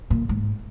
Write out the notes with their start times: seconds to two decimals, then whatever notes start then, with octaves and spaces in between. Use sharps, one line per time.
0.10 A#2
0.29 G#2